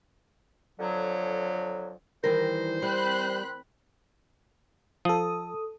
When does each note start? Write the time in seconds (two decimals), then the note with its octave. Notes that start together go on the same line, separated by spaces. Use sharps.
0.80 F2 D3 F#3
2.24 D#3 E3 G3 A#4 C5
2.82 G3 C4 B5 F#6
5.05 F3 A4 D#6